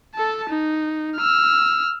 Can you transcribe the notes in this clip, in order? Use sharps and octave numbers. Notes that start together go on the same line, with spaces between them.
A4 A5
D#4
E6 F6